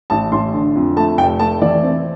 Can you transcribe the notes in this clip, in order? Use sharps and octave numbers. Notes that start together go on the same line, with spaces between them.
A1 A5
A1 C6
D3
F2
A3 A5
F1 G5
A3 A5
E3 D5
C4